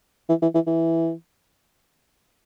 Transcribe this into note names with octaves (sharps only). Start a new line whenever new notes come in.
E3
E3
E3
E3